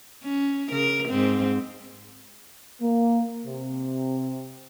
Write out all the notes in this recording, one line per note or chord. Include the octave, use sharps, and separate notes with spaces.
C#4
C#3 A#4
G#2 C4
A#3
C3